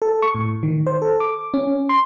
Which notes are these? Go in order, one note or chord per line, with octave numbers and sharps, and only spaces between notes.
A4
C#6
A2
D#3
C5
A4
D6
C#4
C6